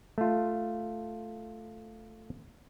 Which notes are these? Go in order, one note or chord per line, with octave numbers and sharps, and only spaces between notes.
A3 F4